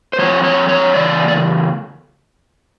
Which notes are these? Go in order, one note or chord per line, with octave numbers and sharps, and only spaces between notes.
C5
F2 C3 F3 C#5
C#5
C#5
E2 C#3 D5
D5